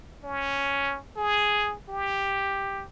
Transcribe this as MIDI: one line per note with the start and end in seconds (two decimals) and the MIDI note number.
0.23 0.97 61
1.17 1.74 68
1.89 2.84 67